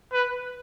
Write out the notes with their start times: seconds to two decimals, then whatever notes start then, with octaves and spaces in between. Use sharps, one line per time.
0.12 B4